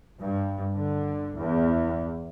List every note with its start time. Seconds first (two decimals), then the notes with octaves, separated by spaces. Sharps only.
0.21 G2
0.74 D3
1.37 E2